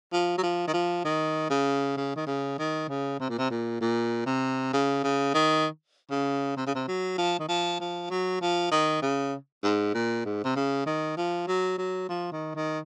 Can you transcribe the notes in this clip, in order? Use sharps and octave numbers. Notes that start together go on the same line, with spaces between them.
F3
F#3
F3
D#3
F3
D#3
C#3
C#3
D#3
C#3
D#3
C#3
C3
A#2
C3
A#2
A#2
C3
C#3
C#3
D#3
C#3
C3
C#3
C3
F#3
F3
D#3
F3
F3
F#3
F3
D#3
C#3
G#2
A#2
G#2
C3
C#3
D#3
F3
F#3
F#3
F3
D#3
D#3